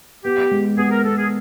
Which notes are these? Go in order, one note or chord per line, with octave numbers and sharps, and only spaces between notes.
B3 G4
G#3
B3 G#4
A#4
B3 A4
G#4